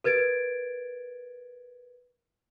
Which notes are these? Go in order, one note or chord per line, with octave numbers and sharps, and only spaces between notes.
A#4 B4 G#6 A6 D7